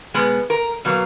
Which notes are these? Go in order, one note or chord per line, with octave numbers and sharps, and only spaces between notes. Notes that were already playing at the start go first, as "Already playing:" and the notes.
B2 G#3 B3
A#4
B2 F#3 A#3